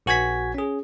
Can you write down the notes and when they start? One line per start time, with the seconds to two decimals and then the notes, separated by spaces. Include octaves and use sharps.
0.06 A#1 F#4 G#5 G#6 B6
0.54 C#4 G#4